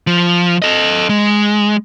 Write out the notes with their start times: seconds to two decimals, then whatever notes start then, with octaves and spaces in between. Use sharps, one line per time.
0.07 F3
0.62 A4 D#5
1.09 G#3